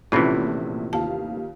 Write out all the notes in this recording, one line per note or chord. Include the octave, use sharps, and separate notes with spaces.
A#1 A2 C3 E3 C#4 F4
D#2 F4 F5 A5